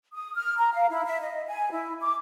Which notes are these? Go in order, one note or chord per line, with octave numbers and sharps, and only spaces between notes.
D#6
F6
A#5
F5
E4
E5
D#5
G#5
E4
D6